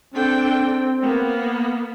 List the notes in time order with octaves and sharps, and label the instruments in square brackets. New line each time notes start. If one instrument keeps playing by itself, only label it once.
[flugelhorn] C4 [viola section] D4 A4 G5
[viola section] A#3 B3